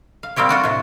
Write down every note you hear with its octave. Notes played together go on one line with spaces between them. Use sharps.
F5
G3 A#3 C4 G4 C#5
F4 F#4 D5
A2 C3